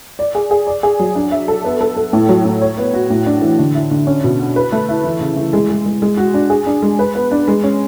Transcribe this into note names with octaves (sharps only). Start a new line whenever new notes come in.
D5
G#4
G#4
D5
G#4
F#3
D4
E5
A4
B3
A4
A4
A2
F#3
A2
C#5
B3
F#4
A2
D4
E3
D3
E4
D3
C#4
B2
F#4
B4
A3
E4
E3
C#3
E3
G#3
G#3
G#3
G#3
F#4
D4
G#4
D4
G#3
B4
B3
D4
G#3
C#4